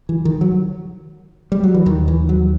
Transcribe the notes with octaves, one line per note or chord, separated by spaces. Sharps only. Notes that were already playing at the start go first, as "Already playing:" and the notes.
E3
D#3
F#3
G3
F#3
E3
D#2 D#3
E3
F#3